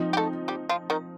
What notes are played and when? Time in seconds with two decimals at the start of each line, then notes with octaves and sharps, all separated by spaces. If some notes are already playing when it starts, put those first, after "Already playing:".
Already playing: F3 C4 D#4
0.13 G4
0.17 A3 A4
0.48 G3 G4
0.69 F3 F4
0.90 D#3 D#4